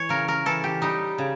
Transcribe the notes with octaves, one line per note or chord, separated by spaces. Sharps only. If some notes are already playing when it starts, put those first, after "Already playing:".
Already playing: E3 C#5
C#3 A#4
A#4
E3 A4
G4
G3 D#4
C#3